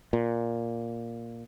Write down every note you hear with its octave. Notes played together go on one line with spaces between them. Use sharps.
A#2